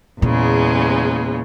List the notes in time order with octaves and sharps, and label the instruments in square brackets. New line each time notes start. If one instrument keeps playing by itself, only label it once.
[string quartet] E2 C#3 G#3 [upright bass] A#2